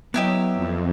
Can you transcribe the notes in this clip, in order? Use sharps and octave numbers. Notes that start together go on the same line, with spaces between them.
F#3 B3 D4 E4 G4 D#5
F2